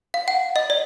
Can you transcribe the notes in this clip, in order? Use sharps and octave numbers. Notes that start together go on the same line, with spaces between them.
F5
F#5
D#5
D5